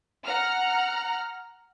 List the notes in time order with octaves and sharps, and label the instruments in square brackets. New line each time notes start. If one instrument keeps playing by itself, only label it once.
[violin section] F#5 A#5 F6